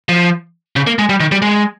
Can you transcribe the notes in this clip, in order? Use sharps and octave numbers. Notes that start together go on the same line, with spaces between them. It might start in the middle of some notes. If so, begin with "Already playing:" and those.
F3
C#3
A#3
G#3
G3
D#3
G3
G#3